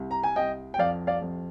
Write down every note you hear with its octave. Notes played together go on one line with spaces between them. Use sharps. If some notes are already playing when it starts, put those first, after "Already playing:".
Already playing: C2
A#5
G#5
C2 D#5 G5
G5
F2 D5 F5
D5 F5
F2